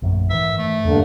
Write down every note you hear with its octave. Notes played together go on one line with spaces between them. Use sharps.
A#1 F#2 A3
G#2 D#3 E3 E5
A3
E2 G2 D3 A#3